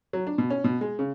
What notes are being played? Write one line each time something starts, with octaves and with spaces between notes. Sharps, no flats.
F#3
D4
B2
C#4
B2
G#3
C#3